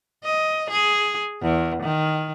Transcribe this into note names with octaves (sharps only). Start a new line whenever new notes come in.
D#5
G#4
E2
D#3